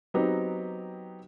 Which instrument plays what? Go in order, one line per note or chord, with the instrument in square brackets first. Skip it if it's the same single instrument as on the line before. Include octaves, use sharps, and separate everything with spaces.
[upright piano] F#3 B3 C4 D#4 G4